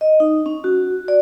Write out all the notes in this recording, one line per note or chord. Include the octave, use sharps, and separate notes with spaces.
D#5
D#4
C#4
F#4
D5